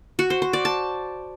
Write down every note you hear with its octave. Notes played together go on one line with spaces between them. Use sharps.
F#4
C5
C5
D5
A5